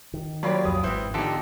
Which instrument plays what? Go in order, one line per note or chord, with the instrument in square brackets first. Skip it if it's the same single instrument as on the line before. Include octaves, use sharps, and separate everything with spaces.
[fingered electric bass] D#3
[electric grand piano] F#3 [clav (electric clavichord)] A#3 F4 G4 [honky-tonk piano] C#5 D5 B5
[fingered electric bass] B1 F2 F3 [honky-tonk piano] D#6
[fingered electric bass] G#1 G#2 [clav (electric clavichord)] E3 C4 [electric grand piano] E4 C5
[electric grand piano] D3 D#4 [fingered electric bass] E3 B3 [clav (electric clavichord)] F4 G4 A4